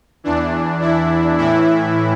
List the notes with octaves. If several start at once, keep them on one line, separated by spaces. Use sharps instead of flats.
E2 E3 D4
E4
A2 E3 E4